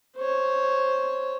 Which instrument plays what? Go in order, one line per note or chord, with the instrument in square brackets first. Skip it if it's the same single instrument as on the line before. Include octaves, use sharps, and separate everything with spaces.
[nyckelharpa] C5 C#5